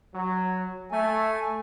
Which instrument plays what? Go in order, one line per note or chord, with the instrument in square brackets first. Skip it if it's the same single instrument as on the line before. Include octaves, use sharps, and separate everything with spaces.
[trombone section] F#3
[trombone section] A3 [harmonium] G#5